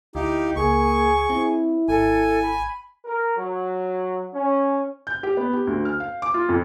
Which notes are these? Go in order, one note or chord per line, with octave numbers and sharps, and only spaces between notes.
D2 D#4 E4 G4 F5
C#2 A#3 G#4 C#6
C4 E4
G#1 A4 G#5
B5
A#4
F#3
C#4
G6
G4
B3
G4
D2
F6
F5
D6
F4
F2